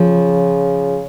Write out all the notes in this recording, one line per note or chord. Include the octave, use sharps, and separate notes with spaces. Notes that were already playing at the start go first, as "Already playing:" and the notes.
Already playing: C#3 F3